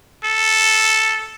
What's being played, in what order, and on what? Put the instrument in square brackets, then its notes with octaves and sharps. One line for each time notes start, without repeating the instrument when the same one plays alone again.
[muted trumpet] A4